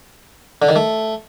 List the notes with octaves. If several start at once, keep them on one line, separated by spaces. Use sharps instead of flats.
D3
D#3
A3